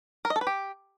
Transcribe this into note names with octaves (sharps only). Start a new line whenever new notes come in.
A#4
D#5
A4
B4
G4